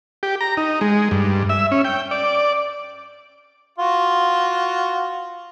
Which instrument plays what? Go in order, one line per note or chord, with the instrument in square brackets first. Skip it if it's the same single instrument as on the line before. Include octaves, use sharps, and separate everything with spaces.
[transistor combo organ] G4
A#5
D#4
G#3
G2
E5
C#4
G5
D5
[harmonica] F4 F#4